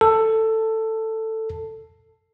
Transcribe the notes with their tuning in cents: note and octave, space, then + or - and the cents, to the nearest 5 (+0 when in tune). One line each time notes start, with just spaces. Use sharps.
A4 +10